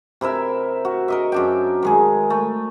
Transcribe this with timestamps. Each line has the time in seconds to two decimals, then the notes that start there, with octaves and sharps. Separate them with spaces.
0.21 C3 E4 A#4 E5
0.85 F#4
1.08 A#4 D#5 E5
1.32 F#2 D4 G5
1.83 D#3 G#3 G#4
2.30 A3